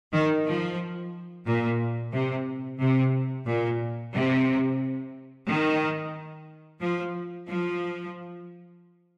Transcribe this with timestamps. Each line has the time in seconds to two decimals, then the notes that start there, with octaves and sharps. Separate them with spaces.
0.13 D#3
0.46 F3
1.47 A#2
2.13 C3
2.80 C3
3.47 A#2
4.14 C3
5.47 D#3
6.80 F3
7.48 F3